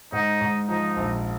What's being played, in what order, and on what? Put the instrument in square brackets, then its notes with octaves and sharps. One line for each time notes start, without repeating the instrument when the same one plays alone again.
[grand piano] G#2 [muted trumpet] D#4
[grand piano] G#2
[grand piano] F3 [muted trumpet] D#4
[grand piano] A#1